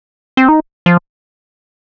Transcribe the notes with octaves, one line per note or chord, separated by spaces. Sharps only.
C4
D#4
F3